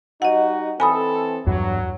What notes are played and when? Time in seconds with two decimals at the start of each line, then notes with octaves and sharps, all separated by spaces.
0.22 G3 D#4 F#4 D#5 F#5
0.80 E3 C4 A4 G#5 B5 D#6
1.47 E2 G2 F#3